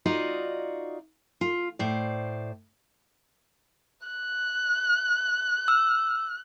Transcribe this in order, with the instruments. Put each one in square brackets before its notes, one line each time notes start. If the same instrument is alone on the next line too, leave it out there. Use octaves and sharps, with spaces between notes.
[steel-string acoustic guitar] D#4 F4 F#4 D5 D#5
F4
A2 C5 D5
[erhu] F#6
[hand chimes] E6